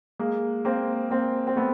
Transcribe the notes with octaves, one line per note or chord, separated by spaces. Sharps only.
G#3 A#3
A#3 C4
A#3 C4
C4
A3 B3